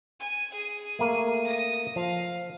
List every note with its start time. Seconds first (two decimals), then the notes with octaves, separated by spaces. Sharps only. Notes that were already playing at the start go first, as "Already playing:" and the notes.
0.20 G#5
0.55 G#4 D#7
0.99 A3 A#3
1.45 D#6 A#6
1.96 F3 F5